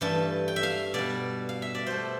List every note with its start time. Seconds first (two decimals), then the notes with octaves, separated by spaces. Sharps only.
0.01 G2 E3 A3 A5
0.48 G5
0.56 E5
0.63 F5
0.94 B2 G3 D5
1.49 F5
1.62 E5
1.75 D5
1.86 B2 A3 C5